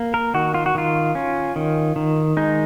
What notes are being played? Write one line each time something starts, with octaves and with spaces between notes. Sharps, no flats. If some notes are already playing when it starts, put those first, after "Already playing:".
Already playing: A#3
A#4
D#3 F#4
F4
F#4
D#3 F4
C#4
D#3
D#3
G#3 D#4